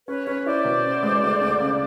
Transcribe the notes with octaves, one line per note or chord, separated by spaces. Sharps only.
C#4 B4 C#5
C#4 B4 C#5
E4 C5 D5
B2
C#4
G#3
D2
D2
C#3